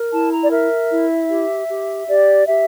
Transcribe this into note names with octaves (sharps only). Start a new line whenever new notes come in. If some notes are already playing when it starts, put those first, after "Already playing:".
Already playing: A#4
E4 A5
A#5
D5
A#4 E5
E4
G4
G4
G4 D5
G4 E5